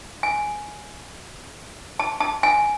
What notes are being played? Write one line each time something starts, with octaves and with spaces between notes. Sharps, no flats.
G#5
A5
A5
G#5